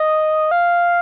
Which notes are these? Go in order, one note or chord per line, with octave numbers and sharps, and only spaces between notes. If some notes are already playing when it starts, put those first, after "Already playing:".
Already playing: D#5
F5